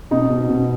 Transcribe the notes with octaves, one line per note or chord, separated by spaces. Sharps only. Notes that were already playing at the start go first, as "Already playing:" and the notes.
B2 D#4
B2
B2